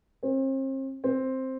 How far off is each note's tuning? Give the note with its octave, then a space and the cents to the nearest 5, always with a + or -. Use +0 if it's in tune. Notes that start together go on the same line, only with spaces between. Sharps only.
C4 +40
C4 +5